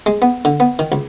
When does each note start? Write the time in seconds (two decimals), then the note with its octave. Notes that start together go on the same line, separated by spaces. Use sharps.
0.06 G#3
0.22 B3
0.45 D3
0.60 B3
0.79 D#3
0.92 C#2